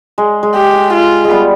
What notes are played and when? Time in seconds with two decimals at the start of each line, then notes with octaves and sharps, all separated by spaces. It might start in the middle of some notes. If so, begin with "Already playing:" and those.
0.18 G#3
0.43 G#3
0.56 G4
0.93 F4
1.25 G#3
1.30 G3 B3